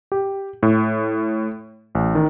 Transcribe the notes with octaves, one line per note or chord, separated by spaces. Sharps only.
G4
A2
A1
D#3